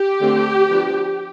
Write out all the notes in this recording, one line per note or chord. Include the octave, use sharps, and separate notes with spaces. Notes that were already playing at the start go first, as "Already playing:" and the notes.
Already playing: G4
D3 A3 C4
F3 B3 D4